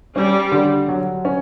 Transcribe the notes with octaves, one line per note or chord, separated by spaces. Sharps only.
G3 C#4
D3
F#3
C#4